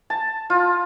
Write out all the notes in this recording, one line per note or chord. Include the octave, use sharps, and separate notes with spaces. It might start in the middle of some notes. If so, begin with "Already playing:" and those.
A5
F4